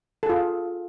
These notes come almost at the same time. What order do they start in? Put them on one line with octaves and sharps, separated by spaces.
A4 G#4 F4